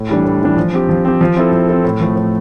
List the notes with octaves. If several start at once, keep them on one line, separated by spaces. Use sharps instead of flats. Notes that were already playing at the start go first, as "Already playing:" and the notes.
Already playing: A2
E3 G3 D4
A2
E3 G3 D4
F3
C4 G4
F3
C4 G4
F3
C4 E4 A4
F3
C4 E4 A4
A2
F3 A3
A2